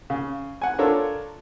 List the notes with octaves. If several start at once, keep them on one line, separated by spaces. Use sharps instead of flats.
C#3
F#5 G#5
D4 F4 A4 A#4 C#5